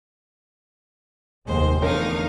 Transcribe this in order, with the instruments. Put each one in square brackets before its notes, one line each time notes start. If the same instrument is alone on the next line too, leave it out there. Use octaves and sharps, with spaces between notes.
[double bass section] F1 D#2 G#3 [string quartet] C5
[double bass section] E2 [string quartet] D3 D#4 F5 [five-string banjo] A3 C#4 A#4